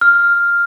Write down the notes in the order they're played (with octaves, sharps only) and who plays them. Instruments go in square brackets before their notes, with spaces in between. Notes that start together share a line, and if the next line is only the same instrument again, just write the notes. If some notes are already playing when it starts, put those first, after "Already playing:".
[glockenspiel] F6